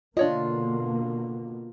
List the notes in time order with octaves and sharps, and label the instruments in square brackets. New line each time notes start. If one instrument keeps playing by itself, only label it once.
[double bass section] B2 D3 A#3 [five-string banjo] D4 C#5 D#5 [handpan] F4